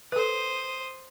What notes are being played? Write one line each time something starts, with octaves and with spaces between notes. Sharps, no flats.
A4 B4 C5 D#6